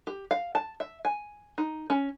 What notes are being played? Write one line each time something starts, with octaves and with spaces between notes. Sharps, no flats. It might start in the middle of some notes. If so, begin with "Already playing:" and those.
G4
F5
A5
E5
G#5
D#4
C#4